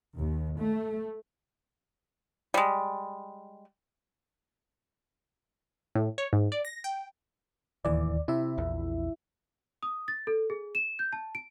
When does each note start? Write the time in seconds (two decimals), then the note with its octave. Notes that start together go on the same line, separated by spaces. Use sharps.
0.17 D#2
0.58 A3
2.54 G3 G#3
5.95 A2
6.18 C#5
6.33 G#2
6.52 D5
6.65 A#6
6.84 G5
7.85 D1 D#2 E3 D5
8.28 C3 E4 E5
8.58 A#1 E2
9.83 D#6
10.08 A6
10.27 A4
10.50 G#4
10.75 E7
10.99 G6
11.13 A5
11.35 D7